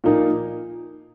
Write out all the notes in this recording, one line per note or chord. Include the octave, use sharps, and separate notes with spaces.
A#2 F3 A#3 D#4